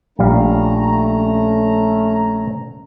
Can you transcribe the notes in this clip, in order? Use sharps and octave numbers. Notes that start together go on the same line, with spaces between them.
A#1 G3 A3 C#4 F5 A#5